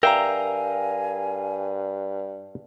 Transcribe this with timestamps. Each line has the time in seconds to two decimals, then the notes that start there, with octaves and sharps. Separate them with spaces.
0.03 G2 A#4 E5 F5 G5 G#5 A#5